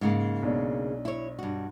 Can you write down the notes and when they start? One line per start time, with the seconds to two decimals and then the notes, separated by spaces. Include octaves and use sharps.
0.01 G#2 C#3 A#3
0.43 B1 D4
1.05 E4 C#5
1.39 G2 F#4